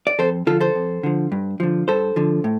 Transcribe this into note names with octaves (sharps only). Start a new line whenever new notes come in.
D5
F2 A4 C5
D3 F3 F4 A4
A4 C5
F2
D3 F3
G2
D3 F3
G2 A4 C5
D3 F3
A2